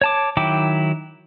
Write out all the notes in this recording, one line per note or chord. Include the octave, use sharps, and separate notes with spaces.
C#5 A5 D6
D#3 F#3 E4 G5 D6